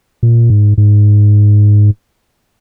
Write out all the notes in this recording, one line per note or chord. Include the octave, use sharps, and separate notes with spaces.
A#2
G#2
G#2